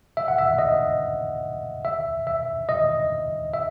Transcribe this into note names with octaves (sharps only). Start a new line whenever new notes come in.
E5
F#5
E5
D#5
E5
E5
D#5
E5